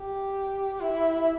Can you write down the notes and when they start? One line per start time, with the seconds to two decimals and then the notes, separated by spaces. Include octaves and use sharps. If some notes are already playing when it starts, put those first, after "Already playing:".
Already playing: G4
0.80 E4